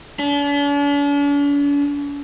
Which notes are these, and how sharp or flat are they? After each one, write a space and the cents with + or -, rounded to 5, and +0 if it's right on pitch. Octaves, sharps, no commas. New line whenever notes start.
D4 -45